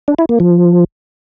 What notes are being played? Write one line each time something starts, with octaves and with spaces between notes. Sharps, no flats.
D4
E4
A#3
F3